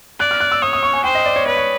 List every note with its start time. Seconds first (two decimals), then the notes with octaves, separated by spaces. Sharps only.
0.20 D5 F#6
0.31 F6
0.40 F#6
0.52 E6
0.62 C#5 D#6
0.73 D#6
0.83 C#6
0.93 G#5
1.04 C5 G5
1.15 D#5
1.26 D5
1.36 C#5
1.46 B4 C#5
1.57 C#5